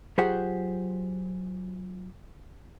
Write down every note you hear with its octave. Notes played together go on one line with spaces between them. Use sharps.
F#3 F4 G4 G#4 C5 F#5